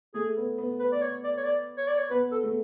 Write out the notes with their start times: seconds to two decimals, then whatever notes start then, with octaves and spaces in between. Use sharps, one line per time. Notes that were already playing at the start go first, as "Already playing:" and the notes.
0.14 A3 G#4
0.37 B3
0.58 B3
0.79 B4
0.92 D5
1.02 C#5
1.24 D5
1.37 C#5
1.44 D5
1.77 C#5
1.88 D5
1.98 C#5
2.10 B3 B4
2.31 A4
2.43 A3